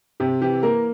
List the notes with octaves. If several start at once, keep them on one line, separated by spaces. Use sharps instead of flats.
C3 G4
E3 G4
A#3 A#4